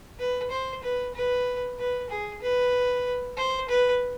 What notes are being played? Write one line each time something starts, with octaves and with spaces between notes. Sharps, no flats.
B4
C5
B4
B4
B4
G#4
B4
C5
B4